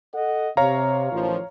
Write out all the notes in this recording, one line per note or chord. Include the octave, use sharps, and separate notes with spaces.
A4 D#5 F#5
C3 C#5 F5 A#5
A1 D#3 F3